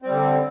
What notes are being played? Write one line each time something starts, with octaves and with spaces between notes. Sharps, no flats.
D3 G3 C4